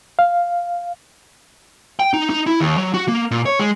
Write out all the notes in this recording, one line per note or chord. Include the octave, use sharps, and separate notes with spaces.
F5
G5
D#4
D#4
E4
D#2
F#3
F#4
A#3
A#2
C#5
G#3